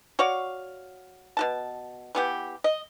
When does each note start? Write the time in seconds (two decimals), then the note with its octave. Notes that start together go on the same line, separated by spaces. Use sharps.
0.19 F#4 C#5 D5 F5
1.37 B2 F#4 A5
2.15 E3 B3 G4
2.64 D#5